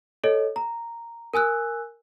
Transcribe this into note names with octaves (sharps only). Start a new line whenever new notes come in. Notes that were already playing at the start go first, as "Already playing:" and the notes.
A4 C#5 D#5
A#5
A#4 G#5 E6 F#6